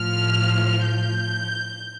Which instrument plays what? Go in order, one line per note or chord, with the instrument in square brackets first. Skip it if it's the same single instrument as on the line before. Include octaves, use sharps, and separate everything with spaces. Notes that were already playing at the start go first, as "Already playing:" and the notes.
Already playing: [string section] A2 F3 F6
G6